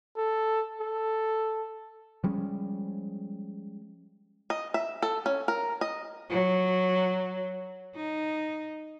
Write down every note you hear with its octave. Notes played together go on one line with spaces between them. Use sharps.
A4
A4
F3 G3 G#3 C#4
D#5
E5
A4
C#4
A#4
D#5
F#3
D#4